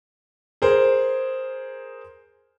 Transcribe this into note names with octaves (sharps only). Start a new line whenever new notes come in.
G#4 A#4 C5